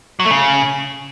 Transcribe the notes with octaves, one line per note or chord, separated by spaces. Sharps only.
F#3
A3
C#3